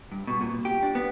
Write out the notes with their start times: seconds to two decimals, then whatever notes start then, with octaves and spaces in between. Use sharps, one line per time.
0.12 G2
0.27 B2
0.41 A#2
0.65 G4
0.83 D4
0.95 B3